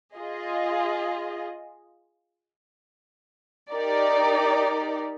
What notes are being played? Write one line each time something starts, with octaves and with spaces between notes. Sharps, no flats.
F4 G#4 D#5
D#4 G4 A#4 D5